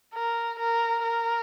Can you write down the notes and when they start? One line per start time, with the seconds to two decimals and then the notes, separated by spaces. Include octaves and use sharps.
0.14 A#4
0.59 A#4
1.04 A#4